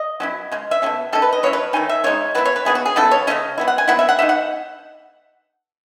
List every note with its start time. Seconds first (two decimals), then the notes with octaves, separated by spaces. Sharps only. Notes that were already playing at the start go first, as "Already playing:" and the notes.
Already playing: D#5
0.20 F#3 C#4 E4
0.52 C#3 G#3
0.71 E5
0.82 B2 F#3 A3 C#4
1.13 D#3 G#3 C#4 A4
1.22 B4
1.33 D#5
1.43 F#3 C#4 E4 C#5
1.53 B4
1.73 D#3 A3 D#4 G#5
1.89 E5
2.04 C#3 G#3 D#4 C#5
2.35 F#3 B3 E4 B4
2.45 C#5
2.56 B4
2.65 E3 B3 E4 G#4
2.75 F#4
2.85 G#4
2.96 C#3 F#3 B3 E4 A4
3.11 C#5
3.27 C#3 F#3 A3 C#4 D#5
3.58 F#3 B3 E4
3.68 F#5
3.78 G#5
3.88 F#3 B3 E4 F#5
3.99 E5
4.09 F#5
4.19 E3 A3 D#4 E5
4.29 F#5